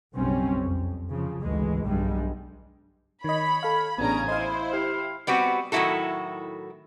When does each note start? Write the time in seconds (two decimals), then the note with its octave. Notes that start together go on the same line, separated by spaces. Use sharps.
0.15 F#1 B1 G3 C4 C#4
0.62 F2
1.10 C#3 F3
1.42 G#1 D2 E3 G#3
1.84 B1 G2 D3 G3 G#3
3.24 D#3 C#5 D#5 B5
3.63 A4 F5
3.98 A1 C#3 B3 C#4 D4 G#5 A#5
4.28 E4 C5 D#5 F5
4.73 G4 F5
5.27 G3 B3 C4 F#4
5.72 A2 D#3 F#3 E4 F#4 A4